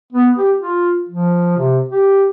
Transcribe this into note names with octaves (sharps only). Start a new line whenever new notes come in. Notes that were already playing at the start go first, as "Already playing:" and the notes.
B3
G4
F4
F3
C3
G4